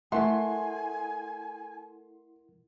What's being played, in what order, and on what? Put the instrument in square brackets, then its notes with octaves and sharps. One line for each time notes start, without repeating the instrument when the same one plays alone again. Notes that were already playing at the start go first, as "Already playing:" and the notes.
[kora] A3 [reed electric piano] E4 A#4 F#5 [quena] G#5 [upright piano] C6